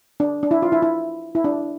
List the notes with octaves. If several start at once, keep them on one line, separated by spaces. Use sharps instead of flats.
D4
D4
E4
F4
E4
E4
E4
D4